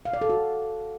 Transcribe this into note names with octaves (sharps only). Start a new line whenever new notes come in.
F5
D5
A4
F#4